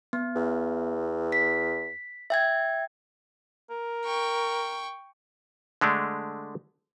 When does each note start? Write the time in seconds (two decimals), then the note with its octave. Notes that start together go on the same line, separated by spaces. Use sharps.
0.13 B3
0.36 E2
1.32 B6
2.30 E5 G5 G#6
3.71 A#4
4.05 G5 C#6
5.81 D3 G#3 A3 D4